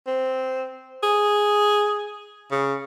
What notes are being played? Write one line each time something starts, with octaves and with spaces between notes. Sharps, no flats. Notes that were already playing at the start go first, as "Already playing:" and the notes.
C4
G#4
C#3